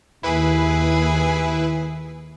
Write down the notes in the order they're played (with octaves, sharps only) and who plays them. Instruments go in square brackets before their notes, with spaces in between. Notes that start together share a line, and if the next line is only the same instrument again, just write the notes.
[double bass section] D#2 [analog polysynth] E4 B4 [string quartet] G#4